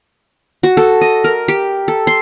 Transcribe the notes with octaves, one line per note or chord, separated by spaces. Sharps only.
F#4
A4
D#5
A#4
G4
A4
C6